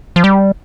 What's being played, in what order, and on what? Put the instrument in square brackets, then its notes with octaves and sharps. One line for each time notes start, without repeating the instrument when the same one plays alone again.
[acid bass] F3
G3